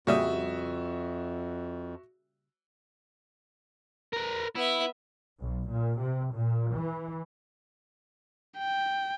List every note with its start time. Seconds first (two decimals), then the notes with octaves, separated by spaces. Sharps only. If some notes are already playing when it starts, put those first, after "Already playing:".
0.07 F2 A#2 C#3 G3 F#4 E5 D#6
4.13 A#4 B4
4.55 B3 E4 E5
5.40 B1
5.69 A#2
5.98 C3
6.34 A#2
6.73 E3
8.58 G5